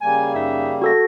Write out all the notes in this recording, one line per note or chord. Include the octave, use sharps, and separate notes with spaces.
C#3 G3 A#3 G#5
F#2 D#4 E5
A3 F#4 A4 A#6